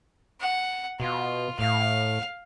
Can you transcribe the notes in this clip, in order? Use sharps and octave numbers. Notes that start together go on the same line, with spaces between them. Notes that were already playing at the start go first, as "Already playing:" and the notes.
F#5
B2 F4
A2 F5